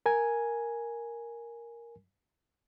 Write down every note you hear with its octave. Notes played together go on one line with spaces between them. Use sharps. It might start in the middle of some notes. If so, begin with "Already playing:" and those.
A#4 G#5